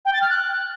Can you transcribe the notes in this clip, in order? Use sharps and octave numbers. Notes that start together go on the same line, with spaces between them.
G5
A6
F6
F#6